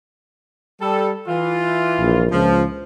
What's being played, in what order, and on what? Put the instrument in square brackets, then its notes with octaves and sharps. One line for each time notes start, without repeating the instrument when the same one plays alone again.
[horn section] G3 A4
E3 F4
[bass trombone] A#1
[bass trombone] C#2 [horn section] F3